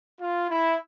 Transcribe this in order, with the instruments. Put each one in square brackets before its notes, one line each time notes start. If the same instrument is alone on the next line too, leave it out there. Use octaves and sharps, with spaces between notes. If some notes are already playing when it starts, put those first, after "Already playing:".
[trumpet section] F4
E4